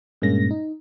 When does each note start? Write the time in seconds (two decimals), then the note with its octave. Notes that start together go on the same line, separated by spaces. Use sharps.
0.22 G2 A#2 G#3 A#3 C#4 A#6
0.51 D#4